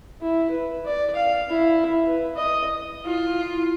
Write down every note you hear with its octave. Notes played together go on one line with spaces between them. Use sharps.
E4
B4
D5
F5
E4
B4
D#5
E4 F4